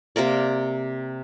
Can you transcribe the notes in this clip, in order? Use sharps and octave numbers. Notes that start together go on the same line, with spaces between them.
C3 A#3 A#4 D5